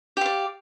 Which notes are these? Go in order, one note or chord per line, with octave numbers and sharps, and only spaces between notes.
G4 D5 F5